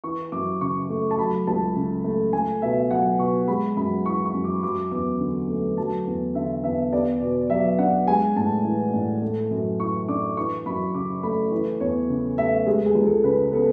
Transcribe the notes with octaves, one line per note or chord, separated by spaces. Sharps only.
E3 C#6
F#2 D6
C#3 C#6
A3
A5
F#3 B5
C#2 A5
C#3
A3
A3 G#5
B2 E5
F#3 F#5
B2 C#6
G#3 B5
F#2 B5
E3 C#6
C#6
F#2
D6
F#3 D6
E2 D6
D3
A3
F#3 A5
E2
D3 E5
E2 E5
B3 D5
B2
F#3 E5
D4 F#5
G#3 G#5
A2 A5
E3
A2
A3
F#2
E3 C#6
D4 D6
E3 C#6
F#2 B5
C#3 D6
A3 B5
E3
E2 C#5
C#3
A3 E5
G#3 G#4
G#4
C#2
A4
C#3 B4
B3 A4